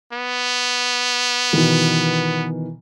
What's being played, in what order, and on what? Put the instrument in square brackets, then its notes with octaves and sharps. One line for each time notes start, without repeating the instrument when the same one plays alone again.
[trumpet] B3
[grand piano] B2 D#3 E3